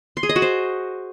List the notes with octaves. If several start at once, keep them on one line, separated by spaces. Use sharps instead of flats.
C6
G#4
D#5
F#4
C5